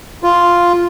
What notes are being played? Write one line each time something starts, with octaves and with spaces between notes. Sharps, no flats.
F4